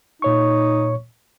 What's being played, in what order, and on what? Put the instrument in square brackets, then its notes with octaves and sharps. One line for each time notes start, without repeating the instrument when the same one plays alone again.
[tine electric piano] A#2 C#5 C#6 [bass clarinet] D#4